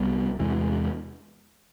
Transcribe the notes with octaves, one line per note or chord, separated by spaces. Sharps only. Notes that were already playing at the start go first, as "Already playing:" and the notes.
Already playing: C2 G3 B3
E2 C3 E3 G#3